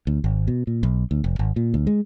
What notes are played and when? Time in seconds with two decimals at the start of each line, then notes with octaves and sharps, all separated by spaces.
0.07 D2
0.24 G#1
0.47 B2
0.67 A#2
0.83 B1
1.11 D2
1.24 F1
1.39 G#1
1.56 A#2
1.74 D2
1.87 G#3